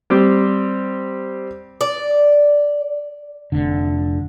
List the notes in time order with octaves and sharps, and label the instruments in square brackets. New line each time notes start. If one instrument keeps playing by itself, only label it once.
[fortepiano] G3 C4 G4 C5
[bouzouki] D5
[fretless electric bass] F1 D3